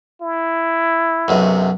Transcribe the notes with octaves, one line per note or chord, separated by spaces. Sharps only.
E4
B1 F#2 C3